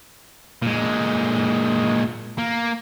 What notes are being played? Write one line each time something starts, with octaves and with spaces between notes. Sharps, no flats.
A#2 G#3
A#3